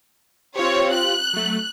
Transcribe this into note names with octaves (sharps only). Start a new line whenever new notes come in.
C4 F4 G4 C#5
F#6
F#3 A3